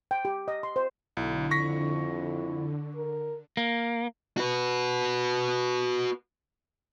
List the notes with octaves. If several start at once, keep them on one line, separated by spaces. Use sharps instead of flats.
G5
G4
D#5
C6
C5
B1 D3 E4
F2 C#6 A#6 B6
A#4
A#3
F#4 B4